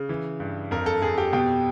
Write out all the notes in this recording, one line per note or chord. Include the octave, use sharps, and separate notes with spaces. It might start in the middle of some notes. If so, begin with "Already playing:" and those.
Already playing: C#3
E3
G2
F2 A#4
A4
F2 G#4
G4
B2 G4